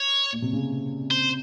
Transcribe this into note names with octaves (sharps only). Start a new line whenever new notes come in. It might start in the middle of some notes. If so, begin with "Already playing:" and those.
Already playing: C#5
A#2
C3
C#3
C5